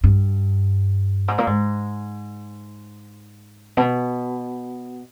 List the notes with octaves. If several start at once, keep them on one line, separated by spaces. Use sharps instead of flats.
G2
G#2
A#2
G#2
B2